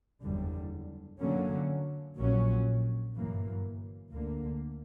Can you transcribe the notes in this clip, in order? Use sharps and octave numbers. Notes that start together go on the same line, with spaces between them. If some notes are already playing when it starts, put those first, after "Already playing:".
F#1 E2 D3 G3
F#2 D3 F#3 A#3 C#4
A#1 A#2 F#3 C#4
G1 F#2 E3 A#3
D2 D3 A#3